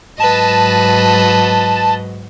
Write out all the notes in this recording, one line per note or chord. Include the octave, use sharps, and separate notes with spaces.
G#2 F#3 B4 D#5 A5